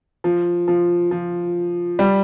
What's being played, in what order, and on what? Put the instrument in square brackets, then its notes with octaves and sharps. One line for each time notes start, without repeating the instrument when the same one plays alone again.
[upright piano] F3
F3
F3
G3